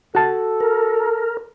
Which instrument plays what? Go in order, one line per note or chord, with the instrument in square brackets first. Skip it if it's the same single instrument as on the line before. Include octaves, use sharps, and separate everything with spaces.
[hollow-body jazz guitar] F#4 A5 [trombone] A4
[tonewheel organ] A#4